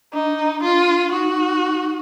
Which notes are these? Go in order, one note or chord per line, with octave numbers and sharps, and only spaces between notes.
D4 D#4
F4
D#4 F#4